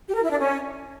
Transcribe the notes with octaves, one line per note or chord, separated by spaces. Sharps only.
G4
A#4
E4
D4
C#4